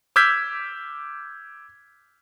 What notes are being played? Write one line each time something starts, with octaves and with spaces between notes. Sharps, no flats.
D6 E6 F6 G6 G#6 B6